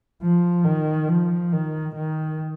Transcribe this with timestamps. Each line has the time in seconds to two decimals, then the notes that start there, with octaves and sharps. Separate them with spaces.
0.22 F3
0.65 D#3
1.09 F3
1.52 D#3
1.95 D#3